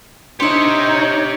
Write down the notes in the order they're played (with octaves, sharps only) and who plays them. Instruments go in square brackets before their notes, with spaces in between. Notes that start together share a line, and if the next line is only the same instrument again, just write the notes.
[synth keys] D4 C#7 [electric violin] D#4 C#5 [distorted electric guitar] G4 E5 [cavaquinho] C5 D#5